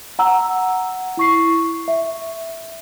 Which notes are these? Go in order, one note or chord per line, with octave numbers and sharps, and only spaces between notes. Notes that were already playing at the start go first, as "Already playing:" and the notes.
F#5 A#5 E6
E4 C#6 C7
E5